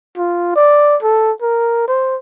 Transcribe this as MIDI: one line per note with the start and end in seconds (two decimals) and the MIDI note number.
0.18 0.51 65
0.56 0.96 74
1.03 1.32 69
1.42 1.88 70
1.88 2.17 72